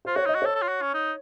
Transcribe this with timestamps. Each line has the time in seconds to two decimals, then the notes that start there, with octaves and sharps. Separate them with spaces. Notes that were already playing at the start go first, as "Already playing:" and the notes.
0.05 F4 C5
0.16 F#4 C#5
0.26 D#4 D#5
0.35 F#4
0.42 A4 C#5
0.55 A4
0.62 F4
0.68 F#4
0.81 C#4
0.94 D#4